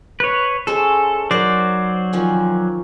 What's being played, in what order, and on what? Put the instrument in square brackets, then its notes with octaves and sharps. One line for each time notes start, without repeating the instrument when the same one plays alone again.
[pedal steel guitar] B4 C#5
[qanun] G#3 C#4 C5 [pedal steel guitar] A4
[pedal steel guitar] F#3 C5 D5 [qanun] D#4 A#4
[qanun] D#3 F3 C#4